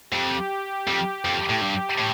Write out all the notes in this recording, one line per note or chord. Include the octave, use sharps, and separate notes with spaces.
F2 G4
F2
F2
A2
G2
A2